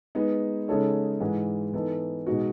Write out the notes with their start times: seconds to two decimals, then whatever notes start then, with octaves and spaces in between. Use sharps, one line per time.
0.15 G#3 B3 D#4
0.68 C#3 G#3 D#4 A4 C#5
1.21 G#2 E3 G#3
1.74 E3 B3 D#4 A4
2.27 B2 G#3 D#4 F#4